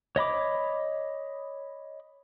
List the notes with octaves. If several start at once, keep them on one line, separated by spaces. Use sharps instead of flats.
C#5 D#5 B5 D6